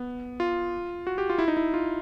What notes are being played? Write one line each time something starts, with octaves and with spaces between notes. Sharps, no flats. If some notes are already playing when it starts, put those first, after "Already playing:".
Already playing: B3
F4
F#4
G4
F4
E4
D#4
E4
F4